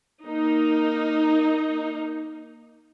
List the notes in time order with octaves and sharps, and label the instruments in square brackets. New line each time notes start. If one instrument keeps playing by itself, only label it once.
[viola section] A#3 D#4